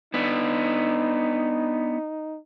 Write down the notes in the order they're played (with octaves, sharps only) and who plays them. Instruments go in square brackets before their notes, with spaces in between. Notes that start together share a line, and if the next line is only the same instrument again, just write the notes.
[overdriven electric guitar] B3 D4 [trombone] D#4